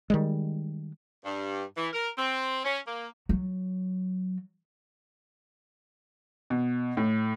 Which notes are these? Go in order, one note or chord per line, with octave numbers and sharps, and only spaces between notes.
D#3 G3 G#3
G2
E3
A#4
C4
C#4
A#3
F#3
B2
A2